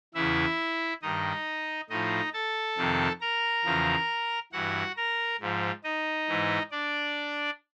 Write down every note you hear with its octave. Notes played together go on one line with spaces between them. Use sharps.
E2 C#3 E3 E4 E5
G2 D#3 D#4 D#5
A2 F3 D#4 D#5
A4 A5
F2 C3 D#3
A#4 A#5
E2 C#3 F3
G2 E3 F#4 F#5
A#4 A#5
G#2 F3
D#4 D#5
G#2 E3
D4 D5